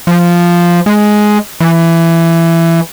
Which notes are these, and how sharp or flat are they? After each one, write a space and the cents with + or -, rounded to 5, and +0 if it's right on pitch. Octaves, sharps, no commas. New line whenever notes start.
F3 -5
G#3 +10
E3 +15